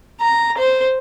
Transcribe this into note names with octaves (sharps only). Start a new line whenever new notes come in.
A#5
C5